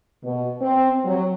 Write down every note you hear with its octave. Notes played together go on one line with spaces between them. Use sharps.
B2
C4
F#3